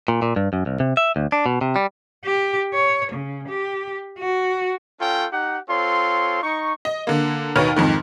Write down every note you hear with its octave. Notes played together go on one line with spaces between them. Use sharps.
A#2
A#2
G2
F#2
C2
C3
E5
D2
D4
B2
C3
G3
G4
C#5
C#3
G4
F#4
C#4 F4 A4 C#5 G5
D#4 G4 F#5
C4 F4 A4 C#5 C6
D#4 C#6
D#5
D3 A#3
D#2 B2 D#4 B4 C#5 F6
F2 G#2 D#3